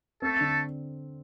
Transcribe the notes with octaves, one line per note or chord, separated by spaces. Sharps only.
A3 C4 A4
D3